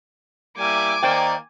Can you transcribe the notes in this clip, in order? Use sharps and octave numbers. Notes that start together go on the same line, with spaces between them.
G3 A#3 E4 G#5 D6
D#3 A#3 C5 D5 G5